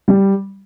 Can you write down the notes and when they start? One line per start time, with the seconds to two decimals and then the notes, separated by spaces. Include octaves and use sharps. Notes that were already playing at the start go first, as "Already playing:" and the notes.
0.08 G3